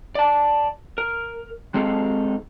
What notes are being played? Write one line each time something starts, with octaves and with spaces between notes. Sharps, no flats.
D5 A5
A#4
G#3 C4 D#4 G#4 A4 F5